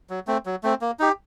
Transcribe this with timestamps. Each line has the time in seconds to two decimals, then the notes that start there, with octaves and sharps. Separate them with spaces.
0.10 F#3
0.27 A3 C4
0.46 F#3
0.63 A3 C4
0.81 A#3
0.99 D#4 G4